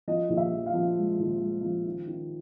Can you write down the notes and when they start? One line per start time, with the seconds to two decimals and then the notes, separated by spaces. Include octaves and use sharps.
0.08 F3 D#5
0.29 A#1
0.37 E5
0.52 F3
0.66 F5
0.74 F3
0.97 G#3
1.19 A#1
1.41 G#3
1.63 F3
1.86 D#3
2.07 D#3